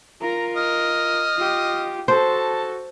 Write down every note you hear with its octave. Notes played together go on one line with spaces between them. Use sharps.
F4 A#4 A#5
D#5 F6
F4 G4
F#4 A4 C5 A5